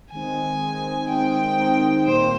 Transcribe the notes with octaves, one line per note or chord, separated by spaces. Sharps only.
D#3 G#3 C4 D#4 G#5
D#3 G#3 C4 D#4
D#3 G#3 C4 D#4 G5
D#3 G#3 C4 D#4
A#2 G3 A#3 C5